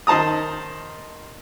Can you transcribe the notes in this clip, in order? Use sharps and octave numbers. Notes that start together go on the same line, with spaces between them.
D#3 C5 A5 A#5 D#6